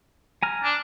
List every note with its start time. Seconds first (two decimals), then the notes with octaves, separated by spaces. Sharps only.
0.43 G#5 A#5 F6
0.63 D4